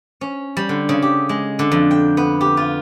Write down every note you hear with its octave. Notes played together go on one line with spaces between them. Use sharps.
C#4
G3
D3
C#3
G4
G#3
D3
F2
G5
B3
G4
F4